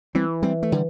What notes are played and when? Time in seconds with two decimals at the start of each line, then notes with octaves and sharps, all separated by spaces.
0.15 E3 G3 C4
0.43 G3 C4
0.63 A3
0.72 D3 G3